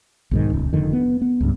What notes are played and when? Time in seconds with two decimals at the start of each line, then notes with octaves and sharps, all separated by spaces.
0.31 B1 G#2 D#3
0.53 D#1 C#2
0.73 F1 F2 D3 D#3
0.93 B3
1.22 B3
1.40 C#2 G2